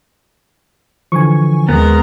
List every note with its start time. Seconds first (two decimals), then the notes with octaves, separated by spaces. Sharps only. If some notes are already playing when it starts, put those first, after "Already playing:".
1.12 D3 E3 F3 G#5 C#6
1.69 D#2 G#3 B3 A#4